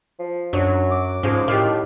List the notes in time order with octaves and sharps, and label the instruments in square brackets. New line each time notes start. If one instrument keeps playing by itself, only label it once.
[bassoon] F3
[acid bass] F#2 [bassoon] F#3 [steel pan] D4
[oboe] D6
[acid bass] G#2 [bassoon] F3 [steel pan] C#4 G#4
[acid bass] A2 [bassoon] D#3 [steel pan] G4 F5